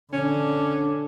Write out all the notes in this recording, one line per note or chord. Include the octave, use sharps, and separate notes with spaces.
D3 C#4 D4